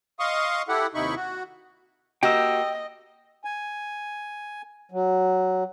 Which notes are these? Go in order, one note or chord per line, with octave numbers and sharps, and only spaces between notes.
D#5 F5 C6 C#6 D#6
E4 G4 A4 F#5
D#2 C3 D#4 E4 B5 C#6
F#4
A#3 F#4 G4 D#5 G5 E6
G#5
F#3